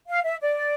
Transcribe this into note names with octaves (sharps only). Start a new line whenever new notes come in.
F5
E5
D5